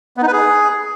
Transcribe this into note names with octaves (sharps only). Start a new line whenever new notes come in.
B3
D#4
B4
G#4